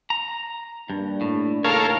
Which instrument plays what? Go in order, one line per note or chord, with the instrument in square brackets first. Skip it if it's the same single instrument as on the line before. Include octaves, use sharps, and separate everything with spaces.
[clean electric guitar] A#5
[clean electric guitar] G2 [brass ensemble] A#3 D4
[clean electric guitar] A2
[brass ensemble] D#2 A2 C#3 [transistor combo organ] A4 A#4 F5 [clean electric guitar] C#5